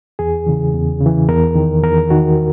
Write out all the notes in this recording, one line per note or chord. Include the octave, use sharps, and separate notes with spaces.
E2 G#4
C#3 E3
E2
C#3
E3
E2 A#4
D#3
E2 A#4
D#3 F#4